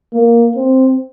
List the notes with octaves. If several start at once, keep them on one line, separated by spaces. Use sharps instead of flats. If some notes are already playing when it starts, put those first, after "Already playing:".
A#3
C4